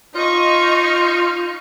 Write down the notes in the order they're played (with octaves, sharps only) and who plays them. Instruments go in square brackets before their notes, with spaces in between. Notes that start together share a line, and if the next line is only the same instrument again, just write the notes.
[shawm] D#4 [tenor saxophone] F4 [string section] D#5 C#6